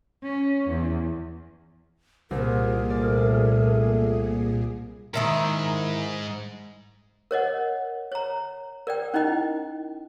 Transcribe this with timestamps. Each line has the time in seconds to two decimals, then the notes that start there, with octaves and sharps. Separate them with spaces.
0.23 C#4
0.68 E2
2.31 C2 A#2 C4 G#4 A#4
2.90 A3 D5
5.14 G#2 D#3 E4 A#4
7.31 A#4 C#5 D#5 F#5
8.12 C#5 A#5
8.87 A#4 D5 G5
9.14 C#4 D#4 E4 D#5 G5